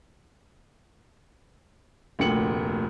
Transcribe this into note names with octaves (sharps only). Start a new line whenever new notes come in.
F1 D2 A#2 G5 C#7 F#7